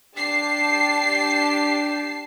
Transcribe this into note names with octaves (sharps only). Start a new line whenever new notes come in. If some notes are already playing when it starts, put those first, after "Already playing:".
D4 G4 A5 C7